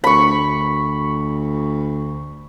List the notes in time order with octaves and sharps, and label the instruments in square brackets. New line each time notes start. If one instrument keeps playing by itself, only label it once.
[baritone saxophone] D2 [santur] B5 C#6